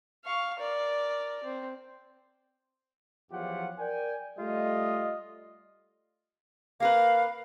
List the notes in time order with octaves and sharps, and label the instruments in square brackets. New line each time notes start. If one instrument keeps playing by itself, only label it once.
[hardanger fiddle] F5 C#6
A#4 D5
C4
[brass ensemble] E2 F3 F#3 F4 G4 F#5
A#4 D5 G5 G#5
G3 A3 F4 D#5
[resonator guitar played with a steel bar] A#3 A#4 B4 [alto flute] F5